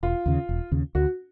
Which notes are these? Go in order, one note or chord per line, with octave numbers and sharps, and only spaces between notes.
E1 F4
D#2 C#3
E1
D#2 C#3
D2 F#4